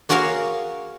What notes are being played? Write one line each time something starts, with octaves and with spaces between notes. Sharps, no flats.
A#3 F#4 G#4 A#4 C#5 F5